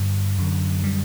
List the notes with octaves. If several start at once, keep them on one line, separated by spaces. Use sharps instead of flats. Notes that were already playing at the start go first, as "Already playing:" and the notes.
Already playing: G2 D3
F#2 D3
G3